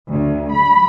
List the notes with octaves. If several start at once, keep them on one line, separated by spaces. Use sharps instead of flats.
D2
B5